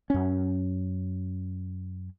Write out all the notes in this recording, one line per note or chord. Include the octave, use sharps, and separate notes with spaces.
F#2 C#4